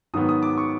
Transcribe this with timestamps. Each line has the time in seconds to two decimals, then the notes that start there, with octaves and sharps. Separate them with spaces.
0.14 G#2 D#3 F#3 B3 D#6
0.29 D#6
0.43 D6
0.58 C#6